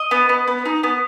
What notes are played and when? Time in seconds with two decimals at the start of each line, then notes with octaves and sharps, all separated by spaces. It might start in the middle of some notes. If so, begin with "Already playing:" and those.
Already playing: D#5
0.11 B3
0.29 B3
0.48 B3
0.65 D#4
0.83 B3